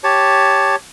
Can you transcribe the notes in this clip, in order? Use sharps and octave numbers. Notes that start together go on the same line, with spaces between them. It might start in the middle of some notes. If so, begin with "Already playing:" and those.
G4 C#5 A5